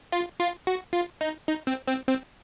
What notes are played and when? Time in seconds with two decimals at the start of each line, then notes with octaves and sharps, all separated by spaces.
0.12 F4
0.40 F4
0.67 F#4
0.93 F4
1.21 D#4
1.47 D#4
1.67 C4
1.88 C4
2.08 C4